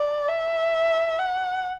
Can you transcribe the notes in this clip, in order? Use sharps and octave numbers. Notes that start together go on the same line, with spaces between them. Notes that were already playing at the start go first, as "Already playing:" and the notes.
Already playing: D5
E5
F#5